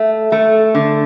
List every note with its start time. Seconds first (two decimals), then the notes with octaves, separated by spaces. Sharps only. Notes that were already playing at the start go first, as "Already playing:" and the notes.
Already playing: A3
0.32 A3
0.75 D3